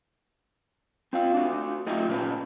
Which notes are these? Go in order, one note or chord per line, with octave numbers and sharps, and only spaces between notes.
C4 F4 F5
D4 F#4
A3 D#4 F4 G4 D#5 E5
A#2 C#4 B4